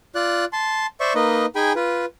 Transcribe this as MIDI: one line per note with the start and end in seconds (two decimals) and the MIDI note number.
0.15 0.45 65
0.15 0.45 74
0.15 0.45 90
0.53 0.87 81
0.53 0.87 84
1.00 1.13 72
1.00 1.13 74
1.00 1.13 76
1.00 1.13 85
1.15 1.46 58
1.15 1.46 63
1.15 1.46 71
1.15 1.46 75
1.56 1.73 63
1.56 1.73 68
1.56 1.73 79
1.56 1.73 80
1.56 1.73 83
1.75 2.05 65
1.75 2.05 71